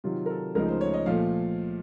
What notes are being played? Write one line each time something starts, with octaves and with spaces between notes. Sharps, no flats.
C3 D#3 F#3 F4
A#4
A4
C#2 C#3 F3 A3 D#4 A#4
C5
C#5
D#5
A#2 F3 A3 F5